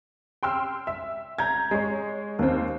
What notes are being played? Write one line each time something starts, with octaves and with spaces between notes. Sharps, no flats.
G5 C6 E6 F6
E5
A#5 G6 G#6
G#3 C#5
D#2 C4